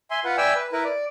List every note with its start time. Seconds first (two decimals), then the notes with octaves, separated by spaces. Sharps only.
0.11 E5 G#5 C6
0.25 F4 B4 F#5
0.38 D5 E5 G5 G#5 E6
0.55 B4
0.73 E4 A#4 B4
0.84 D5